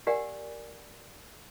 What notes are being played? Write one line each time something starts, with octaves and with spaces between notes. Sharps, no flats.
G4 A#4 D5 F#5 G#5